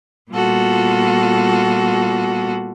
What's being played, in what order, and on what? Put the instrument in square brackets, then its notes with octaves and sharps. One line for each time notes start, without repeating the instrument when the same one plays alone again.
[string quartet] A#2 G3 B3 F4 F#4 A4